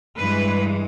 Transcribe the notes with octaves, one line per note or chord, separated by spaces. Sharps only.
G2 E3 G#3 B4